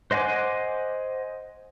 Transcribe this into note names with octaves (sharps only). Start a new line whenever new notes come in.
C5 D#5 F#5 G#5 D6